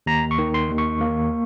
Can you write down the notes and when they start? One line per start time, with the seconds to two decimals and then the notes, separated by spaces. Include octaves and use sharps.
0.06 D#2 A#5
0.31 C#6
0.38 D#3
0.54 C6
0.70 D#2
0.78 C#6
1.01 A#3